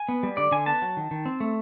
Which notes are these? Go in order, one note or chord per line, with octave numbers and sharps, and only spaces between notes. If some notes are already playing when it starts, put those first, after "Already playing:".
Already playing: G#5
B3
G3
D3 D5
D3 G#5
B3 A5
F#3
D#3
D#3
C4
A3